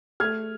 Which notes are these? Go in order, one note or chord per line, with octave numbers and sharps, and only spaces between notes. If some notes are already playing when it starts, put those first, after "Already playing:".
A3 F6 G#6